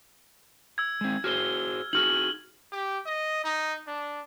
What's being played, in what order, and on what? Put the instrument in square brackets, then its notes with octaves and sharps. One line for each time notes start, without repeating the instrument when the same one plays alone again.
[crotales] E6 G#6
[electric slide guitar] G#3 C4
[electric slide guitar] F#4 G#4 C5 [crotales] F6 G7
[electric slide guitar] D#4 F#4 G#4 [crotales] F6 F#7
[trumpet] G4
D#5
D#4
D4